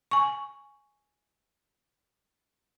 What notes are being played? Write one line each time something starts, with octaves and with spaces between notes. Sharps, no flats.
G#5 C#6